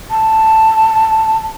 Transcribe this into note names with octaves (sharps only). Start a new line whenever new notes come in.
A5